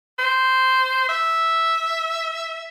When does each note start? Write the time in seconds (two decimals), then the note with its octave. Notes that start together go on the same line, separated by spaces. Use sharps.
0.18 C5
1.09 E5